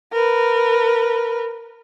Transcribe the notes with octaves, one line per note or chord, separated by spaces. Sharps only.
A#4 B4